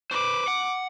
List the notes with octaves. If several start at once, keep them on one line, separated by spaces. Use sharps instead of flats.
B4 C5 D6
F#5